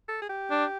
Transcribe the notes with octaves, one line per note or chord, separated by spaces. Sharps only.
A4
G#4
G4
D4